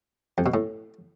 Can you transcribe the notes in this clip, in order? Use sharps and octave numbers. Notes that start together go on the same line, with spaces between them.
F2
B2
A2